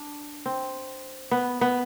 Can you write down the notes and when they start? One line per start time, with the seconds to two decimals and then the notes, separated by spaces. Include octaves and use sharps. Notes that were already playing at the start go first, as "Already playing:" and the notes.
Already playing: D4
0.46 C4
1.31 B3
1.61 B3